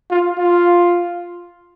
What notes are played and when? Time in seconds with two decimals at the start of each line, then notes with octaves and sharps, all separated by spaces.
0.10 F4
0.39 F4